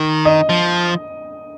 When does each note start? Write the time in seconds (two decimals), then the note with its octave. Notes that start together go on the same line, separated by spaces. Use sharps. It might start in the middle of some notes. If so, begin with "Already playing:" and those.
Already playing: D#3
0.25 D#5
0.49 F3